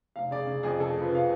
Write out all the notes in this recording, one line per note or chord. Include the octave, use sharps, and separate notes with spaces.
F1 F5
C#3 D5
C#3
F2 G#4
C#3 A4
F3
B4
C#3 F5